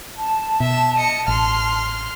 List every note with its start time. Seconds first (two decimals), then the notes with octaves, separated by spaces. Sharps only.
0.17 A5
0.60 B2 E5 E7
0.97 D#5 C#7
1.28 A1 C6 F6